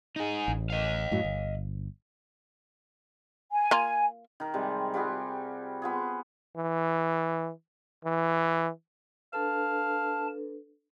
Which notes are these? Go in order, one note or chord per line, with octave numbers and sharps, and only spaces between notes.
D#4 G#4
A1
D#5 F5
F#2 A2 F#3
G1
G#5
A#3 F4
D#3 A#4
C3 G3 G#3
G3 F4 F#4 G#4
B3 F4 G#4
E3
E3
D4 A4 B4 F5 A5